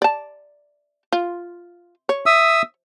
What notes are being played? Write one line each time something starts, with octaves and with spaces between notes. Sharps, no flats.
D5 A5
F4
C#5
E5 D#6 E6